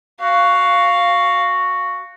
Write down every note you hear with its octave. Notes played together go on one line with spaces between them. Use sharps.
F#4 F5